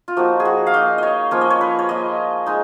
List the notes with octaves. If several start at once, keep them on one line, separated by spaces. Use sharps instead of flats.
F4
F3 A#3 D#4 F#4
G#4
F#4
F5
A#3 D#4 D#5
C#5 D#5
F3 A#3 C#4 F4 C#5
D#5
C#5
B4
C#5
A#3 F4 D#5
G#3 D#4